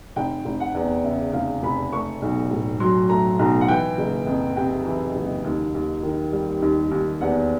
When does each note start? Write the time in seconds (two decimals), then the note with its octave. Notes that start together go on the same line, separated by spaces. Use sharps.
0.16 F1 G5
0.45 F1
0.60 F#5
0.75 E2
1.04 C#3 E5
1.33 F1 F5
1.63 F1 B5
1.92 A3 C#6
2.22 B1
2.51 A2
2.80 F#3 C6
3.09 A3 A#5
3.39 B1 A#5
3.61 F#5
3.68 E3 G5
3.98 F#1
4.27 F2
4.56 C3 G5
4.86 E3
5.16 F#1
5.44 D#2
5.74 D#2
6.03 D#3
6.32 G3
6.62 D#2
6.91 D#2
7.21 E2 F#5